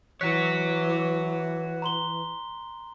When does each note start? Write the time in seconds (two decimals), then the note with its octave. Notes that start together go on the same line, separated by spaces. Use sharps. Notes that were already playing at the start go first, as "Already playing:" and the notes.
0.21 E3 F#4 C#5 F#6 B6
1.82 A#5 C6 G7